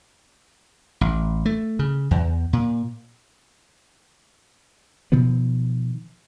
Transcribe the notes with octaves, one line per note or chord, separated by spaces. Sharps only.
A1
A3
C#3
E2
A#2
B2 D#3 F3 B3